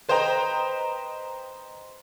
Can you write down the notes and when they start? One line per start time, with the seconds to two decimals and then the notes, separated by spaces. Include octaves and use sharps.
0.09 B4 C5 D#5 G5 A#5